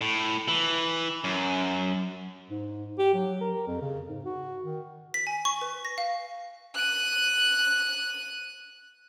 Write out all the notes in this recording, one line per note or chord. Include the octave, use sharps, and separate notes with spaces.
A2
E3
F#2
G#2
G4
F#3
A#4
F2
C#3
G#2
F#4
D#3
B6
G#5
C#6
B4
A#6
F5
F#6 D#7